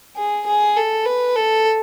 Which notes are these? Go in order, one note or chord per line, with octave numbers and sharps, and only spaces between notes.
G#4
G#4
A4
B4
A4